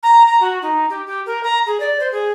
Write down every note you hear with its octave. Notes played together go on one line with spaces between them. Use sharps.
A#5
A#5
F#4
D#4
G4
G4
A#4
A#5
G#4
D5
C5
G#4